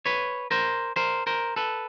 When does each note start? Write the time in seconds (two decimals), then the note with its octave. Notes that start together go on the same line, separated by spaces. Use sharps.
0.06 B4 C#5
0.51 A#4 C5
0.96 A#4 C5
1.27 A#4 C5
1.56 A4 B4